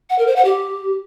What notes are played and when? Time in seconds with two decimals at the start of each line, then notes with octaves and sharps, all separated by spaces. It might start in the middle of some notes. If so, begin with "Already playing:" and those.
0.10 F#5
0.18 A#4
0.27 C5
0.36 F#5
0.45 G4